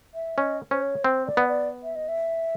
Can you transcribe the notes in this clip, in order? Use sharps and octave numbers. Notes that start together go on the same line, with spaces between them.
E5
C#4 D#5
C#4 C5
C#5
C4 C5
D5
B3
D5
E5
D#5
E5